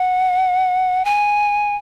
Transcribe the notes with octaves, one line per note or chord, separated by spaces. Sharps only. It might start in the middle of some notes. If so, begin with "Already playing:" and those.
Already playing: F#5
G#5